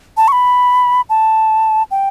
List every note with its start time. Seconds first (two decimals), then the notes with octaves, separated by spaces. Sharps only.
0.17 A5
0.28 C#6
0.32 B5
1.09 A5
1.91 G5